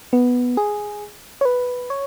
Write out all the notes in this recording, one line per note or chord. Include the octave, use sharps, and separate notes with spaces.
B3
G#4
C#5
B4
C#5